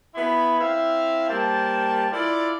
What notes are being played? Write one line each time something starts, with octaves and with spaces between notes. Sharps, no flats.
B3 E4 G#4 B5
C4 E4 E5 F5
G3 A#3 C5 A5
E4 F4 A4 D5